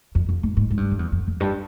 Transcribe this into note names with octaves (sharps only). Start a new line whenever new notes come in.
F2
F2
G#2
G#2
G#2
G2
F2
E2
F2
F2
G2